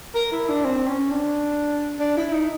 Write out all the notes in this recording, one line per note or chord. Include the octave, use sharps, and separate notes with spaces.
A#4
E4
D4
C4
C#4
D4
D4
E4
D#4